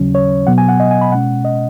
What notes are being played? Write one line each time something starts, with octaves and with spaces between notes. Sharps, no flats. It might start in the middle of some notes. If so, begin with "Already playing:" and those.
Already playing: D#2 C#3 F#3 C#4
C#5
B2 F#3 B3 F#5
G#5
F#5
D#5
G#5
B5
B2 G#3 C#4 F#5
D#5